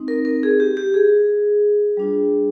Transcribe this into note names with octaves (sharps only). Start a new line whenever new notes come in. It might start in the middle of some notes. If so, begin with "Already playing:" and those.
Already playing: G#3 C4 D#4
A#4
A#4
G#4
G4
G4
G#4
G3 D4 F4